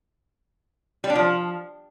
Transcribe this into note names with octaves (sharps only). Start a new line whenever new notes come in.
G3
D4
F3